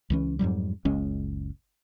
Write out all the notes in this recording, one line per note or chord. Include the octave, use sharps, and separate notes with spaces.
C#2 E3 C#4
F2 G#2 F#3 G3
F#1 C#2 G#3 C#4